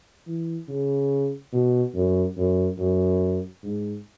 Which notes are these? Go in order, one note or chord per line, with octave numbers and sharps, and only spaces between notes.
E3
C#3
B2
F#2
F#2
F#2
G#2